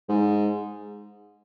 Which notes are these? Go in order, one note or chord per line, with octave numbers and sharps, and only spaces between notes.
G#2